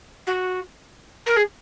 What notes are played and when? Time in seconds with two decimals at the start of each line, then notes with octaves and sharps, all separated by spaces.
0.27 F#4
1.26 A#4
1.36 G#4